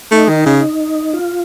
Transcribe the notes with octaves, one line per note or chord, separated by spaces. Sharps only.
A3 D#4
D#3
C#3
F4